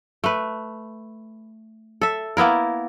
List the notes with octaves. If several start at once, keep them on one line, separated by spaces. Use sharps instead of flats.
A3 B4
A4 E5
A#3 B3 E4 A#4